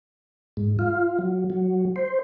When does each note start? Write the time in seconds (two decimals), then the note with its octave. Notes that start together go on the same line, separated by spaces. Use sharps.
0.57 G#2
0.79 F4
1.19 F#3
1.50 F#3
1.96 C5